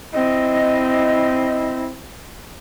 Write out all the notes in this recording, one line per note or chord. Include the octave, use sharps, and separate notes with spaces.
C4 E4 D#5